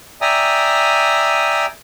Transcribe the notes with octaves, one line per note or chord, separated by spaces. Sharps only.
D5 E5 G5 G#5 A#5 D#6